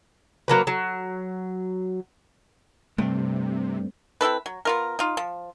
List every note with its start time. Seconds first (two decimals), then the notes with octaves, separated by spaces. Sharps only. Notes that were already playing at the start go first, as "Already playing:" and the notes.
0.48 F#3 A#3 B4
0.67 F#3
2.98 G2 C3 A3 C4
4.21 C4 E4 A4 B4
4.46 F#3
4.65 B3 F4 A#4
4.99 D#4 F4
5.17 F3